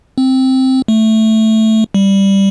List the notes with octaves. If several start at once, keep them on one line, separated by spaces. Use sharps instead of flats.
C4
A3
G3